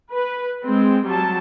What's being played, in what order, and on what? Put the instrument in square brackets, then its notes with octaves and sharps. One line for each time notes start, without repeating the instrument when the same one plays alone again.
[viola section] B4
G#3 C4
F#3 G3 A5